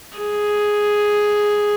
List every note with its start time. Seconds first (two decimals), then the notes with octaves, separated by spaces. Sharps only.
0.18 G#4